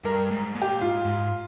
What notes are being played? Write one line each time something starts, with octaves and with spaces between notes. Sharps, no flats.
G2 A#4
G#2
A#2
G4
G#2 F4
G#2